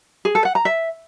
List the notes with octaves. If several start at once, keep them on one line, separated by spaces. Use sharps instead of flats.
G#4
A4
F#5
A#5
E5